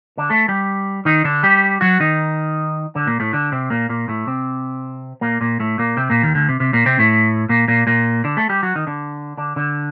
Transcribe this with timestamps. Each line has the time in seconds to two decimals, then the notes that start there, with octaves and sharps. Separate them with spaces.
0.17 D3 D4
0.30 A3 A4
0.48 G3 G4
1.05 D#3 D#4
1.24 D3 D4
1.43 G3 G4
1.81 F#3 F#4
2.00 D#3 D#4
2.95 D3 D4
3.07 A#2 A#3
3.20 A2 A3
3.33 D3 D4
3.52 C3 C4
3.70 A#2 A#3
3.89 A#2 A#3
4.08 A2 A3
4.27 C3 C4
5.21 A#2 A#3
5.41 A#2 A#3
5.60 A2 A3
5.78 A#2 A#3
5.97 C3 C4
6.10 A#2 A#3
6.22 D#2 D#3
6.35 D2 D3
6.49 C3
6.60 C3
6.73 A#2 A#3
6.86 C3 C4
6.99 A2 A3
7.49 A#2 A#3
7.68 A#2 A#3
7.87 A#2 A#3
8.24 D3 D4
8.37 A3 A4
8.49 G3 G4
8.62 F#3 F#4
8.75 D#3 D#4
8.87 D3 D4
9.38 D3 D4
9.56 D3 D4